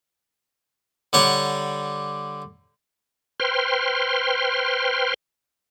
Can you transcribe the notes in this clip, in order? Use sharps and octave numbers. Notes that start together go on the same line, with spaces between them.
D3 G3 C#5 F#5 D6
B4 C5 G5 C6 F6